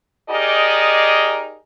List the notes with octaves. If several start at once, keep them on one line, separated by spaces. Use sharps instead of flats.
D#4 G4 G#4 A#4 D5 D#5